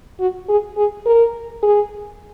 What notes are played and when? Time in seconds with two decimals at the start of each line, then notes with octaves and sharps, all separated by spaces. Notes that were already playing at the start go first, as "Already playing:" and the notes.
0.20 F#4
0.48 G#4
0.77 G#4
1.06 A#4
1.63 G#4